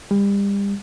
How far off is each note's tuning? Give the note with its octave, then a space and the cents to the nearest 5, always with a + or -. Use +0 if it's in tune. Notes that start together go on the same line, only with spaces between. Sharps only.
G3 +35